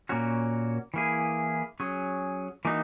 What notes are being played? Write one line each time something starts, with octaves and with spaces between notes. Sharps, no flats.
A#2 A#3 C#4 F#4
E3 A#3 E4 G#4
F#3 C#4 G#4
E3 A#3 D#4 F#4